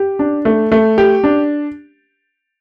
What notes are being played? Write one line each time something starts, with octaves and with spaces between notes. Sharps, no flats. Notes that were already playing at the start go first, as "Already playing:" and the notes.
Already playing: G4
D4
A3
A3
G4
D4